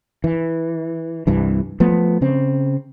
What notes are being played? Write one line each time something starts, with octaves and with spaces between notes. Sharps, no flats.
E3
C2 G2 E3
F3 A3 B3
C#3 C4